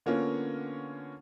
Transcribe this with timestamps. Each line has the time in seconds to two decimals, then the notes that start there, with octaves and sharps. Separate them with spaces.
0.06 D3 A#3 B3 C#4 F4 C#5